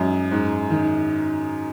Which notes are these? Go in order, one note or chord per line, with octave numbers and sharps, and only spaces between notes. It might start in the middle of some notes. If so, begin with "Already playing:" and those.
Already playing: F#2 G#3
G#2
D#3